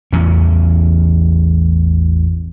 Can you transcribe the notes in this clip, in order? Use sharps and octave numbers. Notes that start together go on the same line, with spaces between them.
A1 E2 C#4